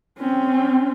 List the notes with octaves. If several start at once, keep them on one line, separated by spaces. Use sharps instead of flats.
C4 C#4